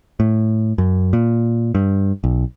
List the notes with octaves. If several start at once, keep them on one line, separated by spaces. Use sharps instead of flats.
A2
F#2
A#2
G2
B1